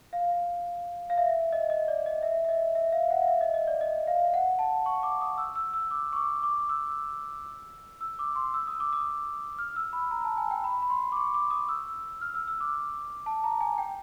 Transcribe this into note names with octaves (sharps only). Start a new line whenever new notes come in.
F5
F5
E5
D#5
D#5
D5
D#5
E5
E5
D#5
E5
F5
F#5
F5
E5
D#5
D#5
D5
D#5
F5
F#5
A5
C#6
D6
D#6
E6
E6
E6
D6
C#6
D6
D6
E6
E6
D6
C6
E6
D#6
D6
D#6
F6
E6
B5
A#5
A5
G#5
G5
B5
B5
C6
D6
C#6
D6
D#6
E6
F6
E6
E6
D6
A5
A#5
G#5
G5